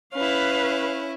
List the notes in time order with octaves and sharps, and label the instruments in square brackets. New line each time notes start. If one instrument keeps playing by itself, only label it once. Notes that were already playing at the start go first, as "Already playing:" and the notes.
[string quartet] C#4 E4 [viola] B4 F5